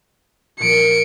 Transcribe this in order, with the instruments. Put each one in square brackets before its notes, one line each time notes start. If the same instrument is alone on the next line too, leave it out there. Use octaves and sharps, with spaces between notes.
[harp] A#2 F3 [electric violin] C#7 D7